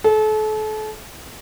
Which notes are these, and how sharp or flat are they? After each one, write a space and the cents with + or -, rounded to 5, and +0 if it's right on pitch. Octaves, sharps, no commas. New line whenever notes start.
A4 -35